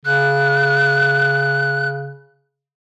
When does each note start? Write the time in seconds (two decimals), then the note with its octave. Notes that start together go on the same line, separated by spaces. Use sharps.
0.05 C#3 F#6